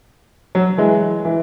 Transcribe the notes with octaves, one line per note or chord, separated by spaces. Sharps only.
F#3
E3 G#3
E3